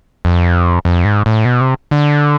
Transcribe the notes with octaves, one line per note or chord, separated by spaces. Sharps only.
F2
F2
G#2
A2
B2
C3
D3